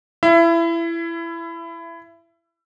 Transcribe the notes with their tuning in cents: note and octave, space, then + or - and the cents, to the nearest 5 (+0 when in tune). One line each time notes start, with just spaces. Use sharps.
E4 +20 E5 +30